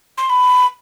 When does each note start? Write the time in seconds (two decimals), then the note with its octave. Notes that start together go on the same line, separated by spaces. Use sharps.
0.18 C6
0.30 B5